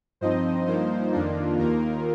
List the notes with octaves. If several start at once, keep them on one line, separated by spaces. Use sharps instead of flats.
G2 F3 C4 D#4 C5 D#5
G2 F3 A#3 D#4 C5
F2 D#3 A#3 D4 F4
D#2 D#3 A#3 F4 A#4